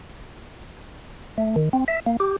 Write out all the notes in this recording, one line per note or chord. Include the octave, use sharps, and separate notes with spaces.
A3
D#3
C4
E5
A#3
G4